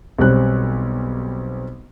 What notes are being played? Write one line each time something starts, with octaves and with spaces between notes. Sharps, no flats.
B1 G3 C4 F#6